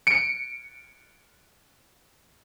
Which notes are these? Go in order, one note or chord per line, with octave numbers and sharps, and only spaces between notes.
C#7 D7